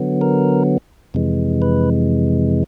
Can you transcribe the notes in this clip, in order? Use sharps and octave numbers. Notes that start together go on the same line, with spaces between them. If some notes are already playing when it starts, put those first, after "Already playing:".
Already playing: D3 F#3 B3
A#4
F2 C3 E3 G#3
B4